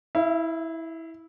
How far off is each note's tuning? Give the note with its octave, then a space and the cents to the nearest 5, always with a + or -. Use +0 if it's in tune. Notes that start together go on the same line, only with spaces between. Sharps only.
E4 -15 E5 +45